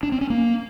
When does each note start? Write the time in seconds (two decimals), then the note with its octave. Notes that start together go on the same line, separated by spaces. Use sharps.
0.03 D4
0.12 C4
0.21 C#4
0.30 A#3